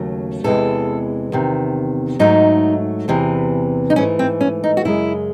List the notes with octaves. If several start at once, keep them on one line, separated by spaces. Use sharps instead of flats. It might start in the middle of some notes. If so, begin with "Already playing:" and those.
Already playing: D#2 C#3 F#3 A3
E2 C3 E3 G#3 A4
E2 C3 D#3
G#2 F#3 A3 D#4
E2 C3 E3
D#4
G#2 E3 A3 C#4
C4
C#4
D#4
F#4
F#2 C#3 G#3 E4